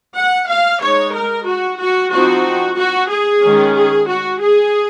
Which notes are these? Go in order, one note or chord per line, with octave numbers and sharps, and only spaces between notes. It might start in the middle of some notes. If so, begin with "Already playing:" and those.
F#5
F5
G#3 D#4 C#5
A#4
F#4
F#4
F3 C4 D#4 F#4
F#4
G#4
D#3 G#3 C#4
G#4
F#4
G#4